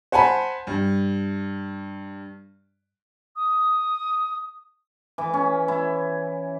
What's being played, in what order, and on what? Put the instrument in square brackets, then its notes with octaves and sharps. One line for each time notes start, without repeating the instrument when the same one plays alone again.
[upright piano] C5 F#5 G#5 A5 B5
G2
[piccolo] D#6
[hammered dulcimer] E3
C#4
E4